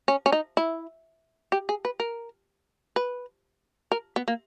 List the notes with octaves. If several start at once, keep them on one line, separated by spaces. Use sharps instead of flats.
C#4
C#4
D#4
E4
G4
G#4
B4
A#4
B4
A#4
B3
A#3